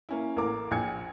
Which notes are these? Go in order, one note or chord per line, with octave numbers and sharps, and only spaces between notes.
A#3 C#4 E4
A1 A#3 A4 A#4 D6
A#1 G5 G#5 G#6 C#7